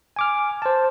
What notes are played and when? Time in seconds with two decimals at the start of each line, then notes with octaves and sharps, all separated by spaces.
0.16 G#5 D6 F6
0.62 C5 A5